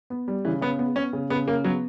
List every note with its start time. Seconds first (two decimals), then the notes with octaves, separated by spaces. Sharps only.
0.10 B3
0.28 G3
0.45 C#3 E3
0.61 C#3 B3
0.79 B3
0.96 B3 C#4
1.13 C#3
1.30 C#3 B3
1.48 C#3 A#3
1.64 F#3 B3